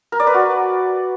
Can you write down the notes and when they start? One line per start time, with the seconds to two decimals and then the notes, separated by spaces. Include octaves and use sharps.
0.12 A#4
0.20 D5
0.27 B4
0.34 F#4